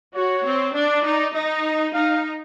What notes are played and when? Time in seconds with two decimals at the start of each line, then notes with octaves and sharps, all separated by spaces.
0.15 F#4 C#5
0.45 C4
0.75 D4 D5
1.04 D#4
1.34 D#4 D#5
1.93 D#4 F5